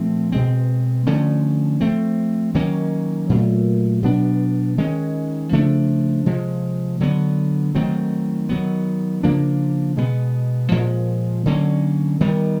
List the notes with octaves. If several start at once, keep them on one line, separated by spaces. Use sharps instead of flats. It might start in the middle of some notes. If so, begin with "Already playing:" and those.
Already playing: A#2 F3 A3 C4
B2 G#3 C4
D3 F3 A3 C#4
F3 A3 C4
D#3 F#3 A#3 C#4
A#2 F#3 A3
B2 F#3 B3 D4
D#3 G#3 C#4
C#3 F3 A3 D4
C3 F3 G#3
D3 F#3 B3
D#3 F#3 A3 C4
D#3 F#3 B3
C#3 F3 A#3 D4
B2 G#3 B3
A#2 F3 G#3
D3 F#3 A#3 C#4
D#3 G3 B3